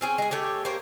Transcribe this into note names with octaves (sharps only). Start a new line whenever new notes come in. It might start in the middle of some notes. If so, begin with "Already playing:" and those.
C4 C#4 G#4
G#3 G#4
A3 G4 C#5
A#3 G4 C5 C#5